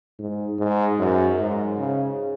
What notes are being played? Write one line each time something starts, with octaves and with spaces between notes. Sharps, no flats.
G#2
G#2
F#2
G#2
C#3